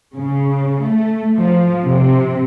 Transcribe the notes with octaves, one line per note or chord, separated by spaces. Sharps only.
C#3
A3
F3
C3